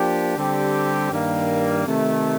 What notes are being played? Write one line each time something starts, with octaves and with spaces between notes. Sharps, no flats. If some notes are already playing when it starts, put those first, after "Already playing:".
Already playing: F3 A#3 D4 G4
D3 G3 C4 G4
G2 D#3 G3 A#3
C3 D#3 A3